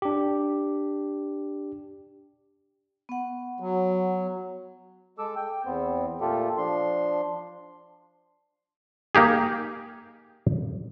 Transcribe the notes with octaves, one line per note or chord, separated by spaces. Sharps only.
D4 G4
B3 F#5
F#3
G#3 A4 D6 E6
G5
E2 B3 C4
A#2 A3 F4 G4 A4
F3 D4 C6
A#3 D#4 G4 G#4